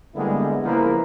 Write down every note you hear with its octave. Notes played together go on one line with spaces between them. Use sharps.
D3 G3 G#3 A#3 B3 E4
C#3 F3 A#3 E4 A#4 B4